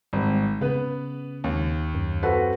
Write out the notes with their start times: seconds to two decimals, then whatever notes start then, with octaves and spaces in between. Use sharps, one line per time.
0.13 G#1 G3
0.61 C#3 B3 B4
1.44 D#2
1.95 F#2
2.23 C4 F#4 A4 B4